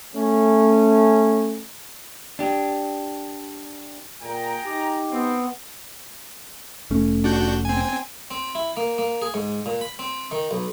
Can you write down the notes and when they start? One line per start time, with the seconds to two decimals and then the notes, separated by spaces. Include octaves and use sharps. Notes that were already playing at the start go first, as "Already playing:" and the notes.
0.15 A3 C#4
2.39 D4 G4
4.23 A#2 G#4 G5 A#5
4.65 D#4 G4
5.12 B3 C4
6.90 F1 A3 C#4
7.24 D4 F#4 G6
7.65 C4 G#5
8.31 C4
8.55 E4
8.77 A#3
8.98 A#3
9.22 G#4
9.34 G#2
9.66 A#2
9.81 B5
9.99 C4
10.31 D#3
10.51 B1